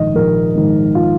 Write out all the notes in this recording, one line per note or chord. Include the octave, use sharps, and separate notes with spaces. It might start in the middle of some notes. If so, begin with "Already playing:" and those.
Already playing: A#1 G#2 D#3 D#5
A#1 A#4
G#2 D#3
F4